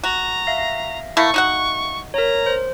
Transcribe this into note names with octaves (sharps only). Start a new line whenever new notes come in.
F#4 A#5
E5 F5 A#6
A3 A#3 E4 C#6
D#4 F#4 F#5
A#4 C#5 A#5
C5